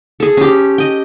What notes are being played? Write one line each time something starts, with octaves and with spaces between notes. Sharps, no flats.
G#4 A4
C#4 G4
D#5 G5